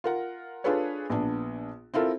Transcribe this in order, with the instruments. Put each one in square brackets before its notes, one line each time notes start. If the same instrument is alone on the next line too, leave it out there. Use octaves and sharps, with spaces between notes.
[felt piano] F4 A#4 F#5
D4 F4 G#4 A4 B4 C#5
A#1 B3 D4
C4 E4 F4 A4 A#4